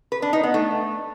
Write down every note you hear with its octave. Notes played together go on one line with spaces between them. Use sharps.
B4
D4
D#4
B3
A3